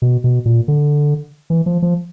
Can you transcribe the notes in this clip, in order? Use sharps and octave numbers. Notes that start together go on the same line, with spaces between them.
B2
B2
A#2
D3
E3
F3
F3